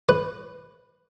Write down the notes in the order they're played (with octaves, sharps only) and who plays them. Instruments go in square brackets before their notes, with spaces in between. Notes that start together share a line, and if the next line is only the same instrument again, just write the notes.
[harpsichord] B4